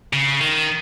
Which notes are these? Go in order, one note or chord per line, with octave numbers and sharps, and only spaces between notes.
C#3
D#3